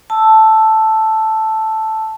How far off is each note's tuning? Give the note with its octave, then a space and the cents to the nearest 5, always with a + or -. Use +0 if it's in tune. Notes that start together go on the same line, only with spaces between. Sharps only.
A5 +0 E6 +0